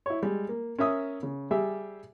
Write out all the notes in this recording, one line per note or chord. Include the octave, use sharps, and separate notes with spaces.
E4 C#5
G3 G#3
A#3
C#4 A#4 E5 D#6
C#3
G3 G4 G#4 E5